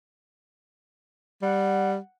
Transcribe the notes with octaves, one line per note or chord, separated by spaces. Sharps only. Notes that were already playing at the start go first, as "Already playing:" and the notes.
G3 F#5